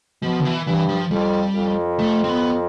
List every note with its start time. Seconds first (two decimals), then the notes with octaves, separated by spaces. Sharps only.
0.22 B2 F3
0.39 D3
0.45 E3
0.66 G2 E3
0.89 F3
1.11 F2 G3
1.55 F2
1.99 A3
2.24 C4
2.29 B3